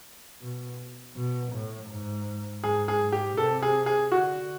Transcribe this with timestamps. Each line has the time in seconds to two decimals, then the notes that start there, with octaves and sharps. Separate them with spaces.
0.41 B2
1.16 B2
1.52 A2
1.89 G#2
2.63 G#2 G#4
2.88 G#4
3.01 G#2
3.12 G4
3.37 C3 A4
3.62 G#4
3.86 G#4
4.12 D3 F#4